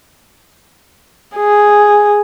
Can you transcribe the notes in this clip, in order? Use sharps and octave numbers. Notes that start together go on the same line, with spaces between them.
G#4